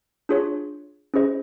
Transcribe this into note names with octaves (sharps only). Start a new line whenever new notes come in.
D4 F4 G#4 C#5
C#4 E4 G#4 C5 D#5